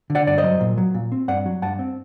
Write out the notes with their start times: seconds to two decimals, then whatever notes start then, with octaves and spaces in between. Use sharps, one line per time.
0.10 D3
0.15 D5 F#5
0.27 G2 D5
0.38 C5 D#5
0.44 F#3
0.60 A#2
0.78 F#3
0.94 A#2
1.12 C4
1.28 G2 D5 F#5
1.45 F#3
1.62 G2 F#5 A5
1.79 C4